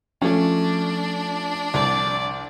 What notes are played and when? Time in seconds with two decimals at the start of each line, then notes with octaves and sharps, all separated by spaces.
0.22 F3 A3 C#4 D4
1.74 C2 D5